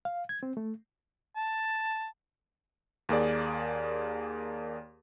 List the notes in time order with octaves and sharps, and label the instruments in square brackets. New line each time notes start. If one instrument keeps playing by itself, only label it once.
[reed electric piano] F5
G#6
C4
A3
[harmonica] A5
[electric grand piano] D#2 A#3 G#4 D5